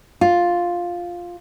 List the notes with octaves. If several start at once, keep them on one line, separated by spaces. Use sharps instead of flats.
F4